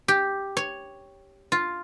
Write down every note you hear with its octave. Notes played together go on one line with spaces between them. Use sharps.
G4
C#5
F4